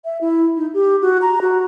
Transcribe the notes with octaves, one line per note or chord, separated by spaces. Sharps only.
E5
E4
D#4
G4
F#4
A#5
F#4